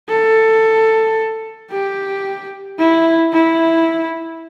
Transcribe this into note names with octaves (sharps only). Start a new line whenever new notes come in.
A4
G4
E4
E4